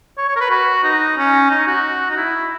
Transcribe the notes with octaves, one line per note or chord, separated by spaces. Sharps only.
C#5
C#5
A#4
B4
F#4
D#4
C#4
D#4
F#4
D#4
E4